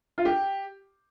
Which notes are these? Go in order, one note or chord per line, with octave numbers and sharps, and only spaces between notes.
F4
G4